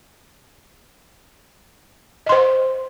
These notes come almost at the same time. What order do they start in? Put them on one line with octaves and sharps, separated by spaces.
D#5 C6 C5